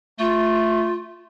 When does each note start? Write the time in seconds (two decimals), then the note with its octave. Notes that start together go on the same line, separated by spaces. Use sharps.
0.20 A3 F4